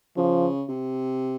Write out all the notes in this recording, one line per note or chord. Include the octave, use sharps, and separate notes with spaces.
C#3 F3
C3